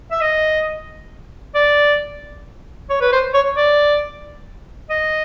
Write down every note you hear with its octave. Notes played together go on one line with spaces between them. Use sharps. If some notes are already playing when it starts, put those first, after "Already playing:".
E5
D#5
D5
C#5
B4
C5
C#5
D5
D#5